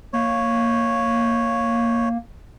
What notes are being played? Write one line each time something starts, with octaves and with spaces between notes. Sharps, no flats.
A#3 C#5